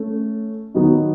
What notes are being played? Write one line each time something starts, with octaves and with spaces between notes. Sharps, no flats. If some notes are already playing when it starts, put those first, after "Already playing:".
Already playing: A3 C#4
D#3 F#3 B3 D#4